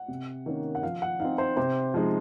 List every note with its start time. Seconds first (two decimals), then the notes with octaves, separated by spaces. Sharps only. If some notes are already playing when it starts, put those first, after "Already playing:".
Already playing: F#5
0.08 C3
0.46 D#3 A#3 C#4
0.75 F#5
0.83 F3 F5
1.02 F#5
1.20 C4 D#4 F5
1.38 C5
1.57 C3 C5
1.94 F3 G#3 D#4